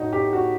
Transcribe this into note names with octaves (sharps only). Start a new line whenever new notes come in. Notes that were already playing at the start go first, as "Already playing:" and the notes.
Already playing: A2 D#4 F#4
G4
F#4